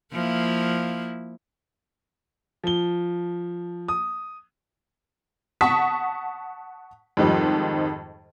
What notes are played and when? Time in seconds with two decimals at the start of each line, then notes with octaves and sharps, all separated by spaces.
0.12 F3 A#3 E4
2.64 F3 G7
3.88 D#6
5.61 F#5 A5 C#6 D#6 B6
7.17 F2 G#2 D#3 F3 G3